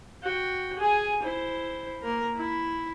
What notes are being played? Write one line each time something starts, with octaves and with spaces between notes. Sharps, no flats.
F#4 G5
G#4 G#5
E4 C5
A#3 A#4
E4